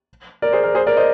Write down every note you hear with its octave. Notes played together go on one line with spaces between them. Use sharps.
A#4 D5
G#4 C5
A#4 D5
G#4 C5
A#4 D5
C5 D#5